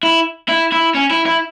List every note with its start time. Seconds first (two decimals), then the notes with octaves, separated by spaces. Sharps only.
0.03 E4
0.48 E4
0.72 E4
0.95 C#4
1.10 E4
1.26 E4